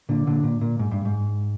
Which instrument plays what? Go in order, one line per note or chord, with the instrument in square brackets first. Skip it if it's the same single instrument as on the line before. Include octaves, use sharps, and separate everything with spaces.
[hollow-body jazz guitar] A#2 D3
A#2 D3
A#2
A#2
G#2
G2
G#2